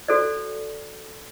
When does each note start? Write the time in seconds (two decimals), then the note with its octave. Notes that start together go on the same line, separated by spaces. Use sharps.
0.08 F#4 A4 C5 D5